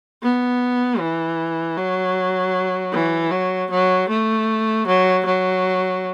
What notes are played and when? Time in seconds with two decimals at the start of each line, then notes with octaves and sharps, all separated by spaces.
0.22 B3
0.99 E3
1.77 F#3
2.93 E3
3.31 F#3
3.70 F#3
4.09 A3
4.87 F#3
5.25 F#3